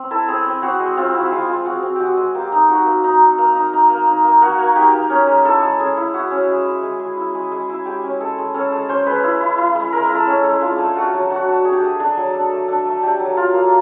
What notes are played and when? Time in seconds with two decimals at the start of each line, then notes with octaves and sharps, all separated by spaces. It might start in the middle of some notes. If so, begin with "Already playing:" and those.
Already playing: C4
0.11 E4 A4
0.28 C4 G#4
0.45 C4
0.62 C4 F#4
0.80 G#3
0.97 C4 F4
1.14 E4 F#4
1.31 G#3 F4
1.49 G#3 F4
1.65 C4 F#4
1.83 C4
1.96 G#3 F#4 G4
2.17 G#3
2.35 A#3 G4
2.52 D#4
2.69 D#4 F#4
2.86 A#3
3.04 D#4
3.21 D#4
3.38 A#3
3.55 D#4
3.73 D#4
3.90 A#3
4.07 D#4
4.24 A#3
4.41 A#3 F#4
4.58 A#3
4.76 D#4 G4
4.94 A#3
5.10 C#4
5.27 G#3
5.45 E4 A4
5.62 G#3
5.80 C#4 G#4
5.97 E4
6.14 E4 F#4
6.31 C#4
6.48 G#3
6.65 E4
6.83 G#3
7.00 G#3
7.17 E4
7.35 G#3
7.52 G#3
7.69 E4
7.85 G#3 G4
8.04 C#4
8.20 G#3 A4
8.38 G#3
8.54 C#4 A4
8.72 G#3
8.89 C#4 C5
9.07 G#3 B4
9.23 E4
9.41 E4
9.58 E4
9.75 G#3
9.92 G#3 A#4
10.09 E4
10.15 A4
10.27 C#4
10.44 G#3
10.61 D4 F4
10.79 A3
10.96 A3 F#4
11.13 F#3
11.30 D4 F#4
11.48 D4
11.64 D4 G#4
11.73 G4
11.80 A3 G#4
11.99 D4 G#4
12.17 F#3
12.33 D4 A4
12.51 A3
12.68 D4 A4
12.86 A3
13.03 D4 G4
13.20 F#3
13.37 F4
13.54 A#3